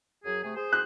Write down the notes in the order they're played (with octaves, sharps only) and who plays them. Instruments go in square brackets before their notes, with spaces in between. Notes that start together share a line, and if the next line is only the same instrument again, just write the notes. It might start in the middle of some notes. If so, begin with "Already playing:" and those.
[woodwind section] F#2 F#3 G#4
C3 A3 G#4
G#4 C5
[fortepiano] F#6